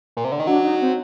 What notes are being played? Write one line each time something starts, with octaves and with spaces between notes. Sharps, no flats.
A#2
C3
D3
D#3
F#3 D4
D#4
C4